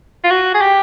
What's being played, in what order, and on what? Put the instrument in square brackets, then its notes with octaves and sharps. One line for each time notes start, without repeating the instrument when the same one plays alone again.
[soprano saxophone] F4
F#4
G#4
G4